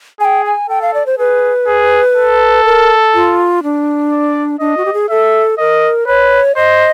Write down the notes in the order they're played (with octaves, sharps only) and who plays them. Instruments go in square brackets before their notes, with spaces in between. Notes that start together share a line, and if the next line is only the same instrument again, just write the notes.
[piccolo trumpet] G#4 [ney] G#5
[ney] G5
G#5
[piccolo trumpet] A4 [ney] G5
[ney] F5
D5
C5
[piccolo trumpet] G#4 [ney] B4
[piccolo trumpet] G#4
A4
[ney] A#4
F4
D4
[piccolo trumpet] D5
[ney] D4 [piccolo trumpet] D#5
[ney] F#4
G4
G#4
[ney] A4 [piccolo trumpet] E5
[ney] A#4 [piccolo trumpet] D#5
[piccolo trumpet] B4 [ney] C#5
[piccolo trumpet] C5 [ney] D#5